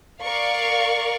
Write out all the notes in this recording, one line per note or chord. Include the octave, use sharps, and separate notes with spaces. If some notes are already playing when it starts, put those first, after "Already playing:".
A#4 D5 F5 C#6